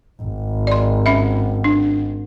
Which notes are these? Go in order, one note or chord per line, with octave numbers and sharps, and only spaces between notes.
G#1
D5 C6
C#4 E5
D4